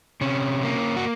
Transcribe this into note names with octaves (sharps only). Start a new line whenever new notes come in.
C3 C#4
A#3
F#4